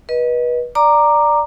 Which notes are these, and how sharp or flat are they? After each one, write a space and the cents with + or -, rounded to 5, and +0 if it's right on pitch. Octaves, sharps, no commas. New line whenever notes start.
B4 -25 D#5 +0
D5 +0 A#5 +0 D6 +15